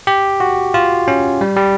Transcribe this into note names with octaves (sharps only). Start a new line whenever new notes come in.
G4
F#4
F4
C#4
G3
G3